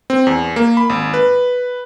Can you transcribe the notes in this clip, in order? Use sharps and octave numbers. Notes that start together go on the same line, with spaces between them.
C4
E2
A#3
B5
G#1
B4